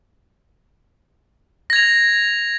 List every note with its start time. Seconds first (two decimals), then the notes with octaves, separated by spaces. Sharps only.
1.70 A#6
1.73 G#6
1.76 F7